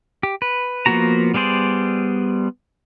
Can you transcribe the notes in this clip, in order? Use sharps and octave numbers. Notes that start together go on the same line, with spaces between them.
G4
B4
F3 A#3 B3 F#4 A#5
G3 B3 G#4 C5 D5